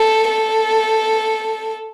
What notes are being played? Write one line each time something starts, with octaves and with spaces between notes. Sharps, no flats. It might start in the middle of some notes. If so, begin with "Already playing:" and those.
Already playing: A4
A4